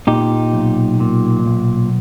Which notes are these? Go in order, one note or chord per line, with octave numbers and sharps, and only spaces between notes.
A#2 D#4 G4
B1
A#2
B1